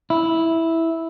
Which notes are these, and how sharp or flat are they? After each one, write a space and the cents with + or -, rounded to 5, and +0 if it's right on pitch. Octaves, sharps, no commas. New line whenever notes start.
E4 -5